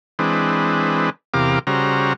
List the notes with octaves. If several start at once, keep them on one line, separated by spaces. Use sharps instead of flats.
E3 G#3 C4 D4 B4
E2 C3 G4 A#4 F5 D6
C#3 G3 F#4 C5 A#5